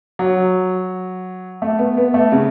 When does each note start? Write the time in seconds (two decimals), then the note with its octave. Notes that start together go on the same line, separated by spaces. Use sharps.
0.19 F#3
1.62 A3
1.79 B3
1.97 B3
2.14 A3
2.32 C#3